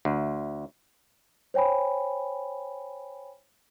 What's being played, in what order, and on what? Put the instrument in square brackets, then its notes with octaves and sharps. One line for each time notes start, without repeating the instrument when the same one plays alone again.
[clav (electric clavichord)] D2
[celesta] C5 C#5 G5 G#5 B5